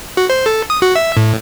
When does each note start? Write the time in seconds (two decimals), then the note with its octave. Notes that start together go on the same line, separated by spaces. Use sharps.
0.17 F#4
0.30 C5
0.46 A4
0.70 D#6
0.82 F#4
0.96 E5
1.17 A2